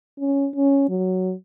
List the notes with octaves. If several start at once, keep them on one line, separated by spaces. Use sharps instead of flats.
C#4
C#4
F#3